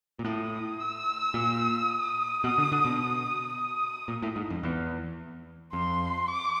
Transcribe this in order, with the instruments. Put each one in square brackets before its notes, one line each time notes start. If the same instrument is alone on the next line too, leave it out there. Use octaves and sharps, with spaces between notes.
[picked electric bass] A#2
[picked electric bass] A2 [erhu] D#6
[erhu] E6
[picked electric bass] A#2
[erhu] D#6
[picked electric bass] B2 [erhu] D#6
[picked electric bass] D3
D3
B2
[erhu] D#6
D#6
[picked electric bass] A#2
A2
G#2
F2
E2
[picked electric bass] F2 [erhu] C6
[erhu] D6